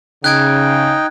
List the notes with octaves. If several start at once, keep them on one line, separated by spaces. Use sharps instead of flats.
C#3 D#4 G5 F#6 G#6 D7